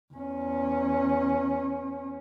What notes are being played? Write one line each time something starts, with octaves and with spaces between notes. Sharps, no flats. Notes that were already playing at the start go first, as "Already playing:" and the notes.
E2 C#4